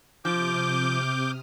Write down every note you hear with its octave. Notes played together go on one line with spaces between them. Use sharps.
C3 F3 D6 D#6 F6 G6